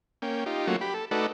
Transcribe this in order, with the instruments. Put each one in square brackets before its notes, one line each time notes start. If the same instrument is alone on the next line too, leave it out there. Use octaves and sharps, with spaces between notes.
[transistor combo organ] A#3 C#4 G5
D#4 F4 G4
F#3 A3 A#3 C#4 F4 F#4
G4 B5
A4
A3 D#4 F#4 A4 B4 D5